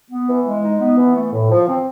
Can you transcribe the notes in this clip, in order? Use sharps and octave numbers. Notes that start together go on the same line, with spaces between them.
B3
E3
G#3
D#4
B3
E3
A3
A2
F3
C4